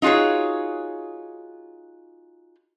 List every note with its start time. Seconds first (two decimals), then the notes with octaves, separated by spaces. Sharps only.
0.02 D#4 F4 F#4 G#4 C#5